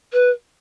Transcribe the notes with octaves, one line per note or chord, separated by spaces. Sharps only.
B4